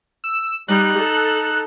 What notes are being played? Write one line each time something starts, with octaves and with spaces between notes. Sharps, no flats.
E6
G3 D#4 F#6
A4